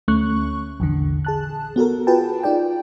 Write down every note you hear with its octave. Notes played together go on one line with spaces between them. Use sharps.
D2 A3 C#4 C#6 F#6
A#1 E2 D3
G#4 A5 F#6
B3 F#4 A4 A#4
F4 F#4 G#4 B4 G5 A5
D#4 F4 D5 G5